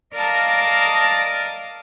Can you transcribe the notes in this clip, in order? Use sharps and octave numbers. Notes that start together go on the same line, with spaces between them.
A#4 D5 D#5 F5 A5 D#6